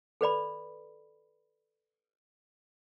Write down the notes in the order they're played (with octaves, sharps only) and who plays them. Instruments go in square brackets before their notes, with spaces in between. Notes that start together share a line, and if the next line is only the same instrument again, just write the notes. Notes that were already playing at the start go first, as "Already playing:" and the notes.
[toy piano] A4 B4 D5 B5